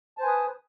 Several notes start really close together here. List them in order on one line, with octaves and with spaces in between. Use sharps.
A5 C5 G#5 B4 D#6